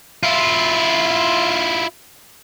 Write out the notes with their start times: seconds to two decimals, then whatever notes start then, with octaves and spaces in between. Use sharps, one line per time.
0.23 E4 F4